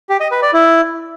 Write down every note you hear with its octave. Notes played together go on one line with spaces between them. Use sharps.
G4
D#5
B4
D5
E4